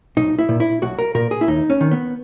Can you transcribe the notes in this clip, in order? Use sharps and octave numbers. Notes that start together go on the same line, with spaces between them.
B1 D#4
E4
A#2
E4
B1 F#4
A#4
A#2 A#4
G#4
E4
D#2 D#4
C#4
D#3
B3